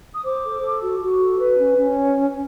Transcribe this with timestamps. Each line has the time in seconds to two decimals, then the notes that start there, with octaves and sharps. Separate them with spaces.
0.13 D#6
0.23 C5 D6
0.43 A4
0.61 A4
0.81 F#4
1.00 F#4
1.19 A4
1.39 B4
1.59 C#4
1.78 C#4